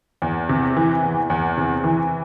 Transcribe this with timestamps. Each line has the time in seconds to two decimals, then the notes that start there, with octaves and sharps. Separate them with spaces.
0.22 E2
0.49 C3
0.77 E3
1.03 E2
1.30 E2
1.57 C3
1.84 E3